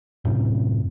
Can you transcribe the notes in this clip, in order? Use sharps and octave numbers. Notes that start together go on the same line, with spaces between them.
F#2 A2 C3